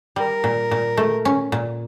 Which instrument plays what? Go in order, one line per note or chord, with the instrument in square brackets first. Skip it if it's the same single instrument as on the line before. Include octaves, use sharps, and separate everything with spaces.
[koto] G3 [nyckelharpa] A#4
[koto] A#2
A#2
A3
C#4
A#2